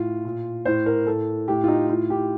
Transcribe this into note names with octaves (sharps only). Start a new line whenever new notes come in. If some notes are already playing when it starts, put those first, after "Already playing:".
Already playing: A2 F4
A#2
A2 C5
A#4
A2 A4
A2 G4
F4
D#4
A2 F4
G4